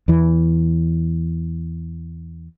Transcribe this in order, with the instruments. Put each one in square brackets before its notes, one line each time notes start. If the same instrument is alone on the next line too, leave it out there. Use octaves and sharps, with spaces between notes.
[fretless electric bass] E2 E3